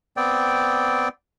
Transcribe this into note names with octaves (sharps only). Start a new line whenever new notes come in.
B3 C4 D5 G5